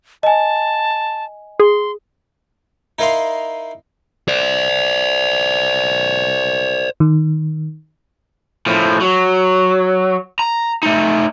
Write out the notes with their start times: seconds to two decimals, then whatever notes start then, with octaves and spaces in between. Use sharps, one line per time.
0.23 D#5 G#5 A5
1.60 G#4 C6
2.99 D#4 E4 A#4 D#5 F5 C6
4.28 C5 D5
7.00 D#3
8.66 A2 F3
9.00 F#3
10.39 A#5
10.83 A3 D#4